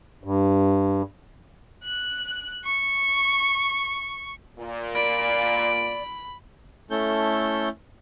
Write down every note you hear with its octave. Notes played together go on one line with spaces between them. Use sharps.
G2
F#6
C#6
A#2
D5 B5 D7
A3 C#4 E4 A4 G6